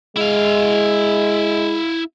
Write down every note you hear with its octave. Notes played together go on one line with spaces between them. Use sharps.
G#3 E4 F5